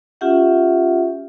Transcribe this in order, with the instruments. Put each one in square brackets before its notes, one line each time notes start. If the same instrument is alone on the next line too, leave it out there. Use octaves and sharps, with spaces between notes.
[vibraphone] C#4 F4 G4 E5 F#5